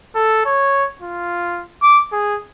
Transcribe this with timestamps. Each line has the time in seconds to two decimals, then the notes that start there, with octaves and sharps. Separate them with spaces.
0.15 A4
0.46 C#5
1.02 F4
1.82 D6
2.13 G#4